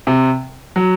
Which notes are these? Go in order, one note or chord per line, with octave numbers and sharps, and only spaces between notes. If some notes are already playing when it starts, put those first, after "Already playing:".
C3
F#3